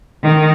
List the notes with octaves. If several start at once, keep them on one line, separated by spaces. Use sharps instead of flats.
D#3